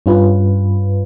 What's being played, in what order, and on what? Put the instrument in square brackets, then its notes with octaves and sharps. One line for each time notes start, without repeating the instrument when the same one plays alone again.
[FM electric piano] G2 C#4 F4 B4